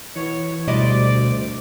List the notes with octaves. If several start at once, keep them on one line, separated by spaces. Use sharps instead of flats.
B2 E3 C#5
D2 B2 G3 C5 D5 D#5